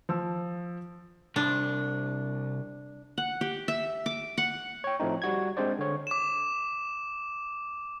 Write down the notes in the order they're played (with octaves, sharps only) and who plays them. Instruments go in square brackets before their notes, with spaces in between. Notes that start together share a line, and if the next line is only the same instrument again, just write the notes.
[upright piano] F3 E6
[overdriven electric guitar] C2 [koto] D4
[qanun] F#5
G4
E5
D6
F#5
[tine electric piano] C#5 G5
A2 F3 A3 C4 D#4
G3 F#4 G#6
G#3 C4 D4 C5 D5
D3 C#5
[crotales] D6 E7